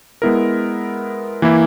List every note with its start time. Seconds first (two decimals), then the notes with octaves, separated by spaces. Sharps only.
0.22 G#3 B3 E4 A#4
1.42 E3 A#3 E4